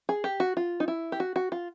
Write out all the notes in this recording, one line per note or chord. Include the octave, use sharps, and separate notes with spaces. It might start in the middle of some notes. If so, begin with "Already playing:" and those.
G#4
G4
F#4
F4
D#4
E4
G4
F#4
F#4
F4